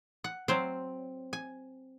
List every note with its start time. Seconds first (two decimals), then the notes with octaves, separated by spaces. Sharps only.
0.24 F#5
0.48 F#3 C4 C5 F5
1.33 G#5